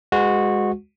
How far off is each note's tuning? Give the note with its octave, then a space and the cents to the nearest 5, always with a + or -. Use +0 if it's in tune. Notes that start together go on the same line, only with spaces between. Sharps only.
G#3 -15 F#4 -15 B4 +35